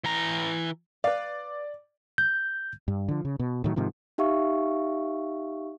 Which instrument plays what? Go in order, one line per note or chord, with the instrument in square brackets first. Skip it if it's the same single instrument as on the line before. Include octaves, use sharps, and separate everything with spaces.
[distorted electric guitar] E3 A#5
[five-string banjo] B4 F5 [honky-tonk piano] D5
[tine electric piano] G6
[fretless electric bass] G2
D3 F3
C#3
B2
A2 D#3 F#3
G#2 C3 D#3 F3
[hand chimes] D#4 G4 E5 F5 C#6